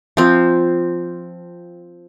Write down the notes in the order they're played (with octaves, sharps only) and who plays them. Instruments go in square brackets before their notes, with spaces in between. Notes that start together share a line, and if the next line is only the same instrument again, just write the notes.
[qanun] F3 C4